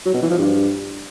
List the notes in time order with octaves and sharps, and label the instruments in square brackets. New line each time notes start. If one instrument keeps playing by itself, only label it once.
[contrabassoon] F#3
B2
E3
F3
G2